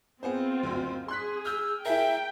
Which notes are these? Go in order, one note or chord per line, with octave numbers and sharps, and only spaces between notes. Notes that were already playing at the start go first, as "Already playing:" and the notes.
B3 C4 F4 G#4 C5
F#1 D2
G#4 C6 F#6 B6
E6 F6 G6
E4 G#4 A#4 E5 G5